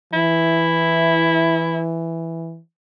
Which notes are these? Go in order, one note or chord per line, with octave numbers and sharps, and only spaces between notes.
E3 E4